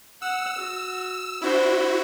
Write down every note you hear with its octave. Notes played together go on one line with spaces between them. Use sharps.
F#5 E6
F#4
D4 E4 F#4 C5